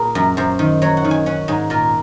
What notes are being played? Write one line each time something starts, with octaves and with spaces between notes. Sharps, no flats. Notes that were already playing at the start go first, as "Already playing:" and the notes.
Already playing: A#2 G#4 A#4
F#2
F#2 C5
D#3
F#3 C#5
F#5
D#3
G#5
C#4 F#5
G#2 G#4
A#2 A#4